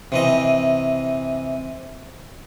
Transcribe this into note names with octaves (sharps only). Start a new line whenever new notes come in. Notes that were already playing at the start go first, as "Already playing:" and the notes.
C3 E3 D#5